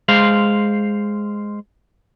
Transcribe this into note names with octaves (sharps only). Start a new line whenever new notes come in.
G#3 C5 F5